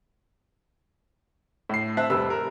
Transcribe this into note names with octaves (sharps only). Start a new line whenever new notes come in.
A2 C7
C4 E5 A5 F#6
F1 G3 B4 E6
A#4